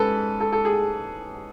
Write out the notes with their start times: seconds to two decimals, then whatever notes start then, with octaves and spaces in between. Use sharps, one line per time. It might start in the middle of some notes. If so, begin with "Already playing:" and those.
Already playing: G#2 C#4 A4 B4
0.40 A4
0.52 A4
0.65 G#4